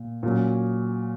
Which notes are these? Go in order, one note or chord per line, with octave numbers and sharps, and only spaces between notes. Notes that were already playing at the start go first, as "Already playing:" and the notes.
Already playing: A#2
A#2 F#3 C#4